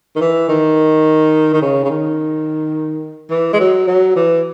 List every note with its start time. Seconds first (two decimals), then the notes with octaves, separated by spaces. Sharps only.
0.16 D#3
0.21 E3
0.49 D#3
1.54 D#3
1.62 C#3
1.84 C#3
1.90 D#3
3.30 E3
3.53 G#3
3.60 F#3
3.87 F#3
4.16 E3